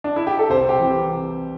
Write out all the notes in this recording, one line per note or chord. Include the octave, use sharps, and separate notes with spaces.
D4
E4
G4
A4
C2 C5
G4
C3 E3